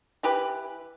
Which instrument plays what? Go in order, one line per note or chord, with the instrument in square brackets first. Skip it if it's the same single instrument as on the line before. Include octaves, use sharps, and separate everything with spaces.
[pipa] E3 G4 B4